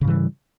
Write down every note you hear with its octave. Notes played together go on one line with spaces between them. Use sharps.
G#2 C#3 E3 G3